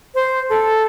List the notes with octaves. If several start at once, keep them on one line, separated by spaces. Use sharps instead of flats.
C5
A4